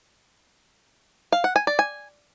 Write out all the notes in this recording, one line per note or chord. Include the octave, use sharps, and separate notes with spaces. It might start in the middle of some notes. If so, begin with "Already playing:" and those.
F5
F#5
G#5
D5
G#5